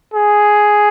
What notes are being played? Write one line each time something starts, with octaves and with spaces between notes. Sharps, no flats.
G#4